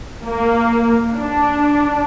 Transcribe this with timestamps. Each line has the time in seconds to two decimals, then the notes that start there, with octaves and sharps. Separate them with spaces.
0.24 A#3
1.12 D4